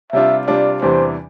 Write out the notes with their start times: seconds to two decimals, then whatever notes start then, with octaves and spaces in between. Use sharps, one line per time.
0.12 C3 G3 D4 F4 E5
0.47 C3 G3 D4 F4 D5
0.82 E2 C3 E3 G3 D4 C5